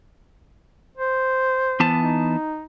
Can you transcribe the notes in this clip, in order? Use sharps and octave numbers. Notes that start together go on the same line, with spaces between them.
C5
E3 B3 A5
D#4